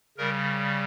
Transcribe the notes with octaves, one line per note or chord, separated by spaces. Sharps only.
C#3 G3 A#4